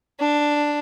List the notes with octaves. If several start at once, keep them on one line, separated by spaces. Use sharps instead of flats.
D4